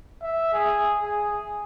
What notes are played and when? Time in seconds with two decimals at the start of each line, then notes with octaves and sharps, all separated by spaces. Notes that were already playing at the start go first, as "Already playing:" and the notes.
0.23 E5
0.53 G#4
1.04 G#4